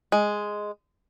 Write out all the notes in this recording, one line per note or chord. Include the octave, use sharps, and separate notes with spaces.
G#3